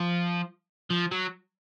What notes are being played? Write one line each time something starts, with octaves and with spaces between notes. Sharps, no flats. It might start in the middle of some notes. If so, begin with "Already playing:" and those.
Already playing: F3
F3
F#3